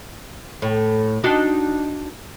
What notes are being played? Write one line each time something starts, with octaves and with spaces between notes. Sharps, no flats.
A2
D4 D#4 F#4